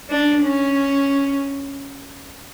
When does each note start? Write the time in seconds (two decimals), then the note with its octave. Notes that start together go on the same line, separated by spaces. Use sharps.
0.10 D4
0.42 C#4